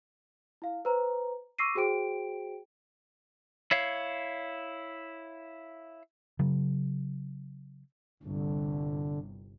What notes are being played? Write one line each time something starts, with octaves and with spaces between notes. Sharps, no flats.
E4 F5
B4 C5 A#5
C#6 D6 E6 A#6 C7 D#7
F#4 G#4 C5 G5 D7
E4 C#5 F5
C#3 F#3
G1 C2 D3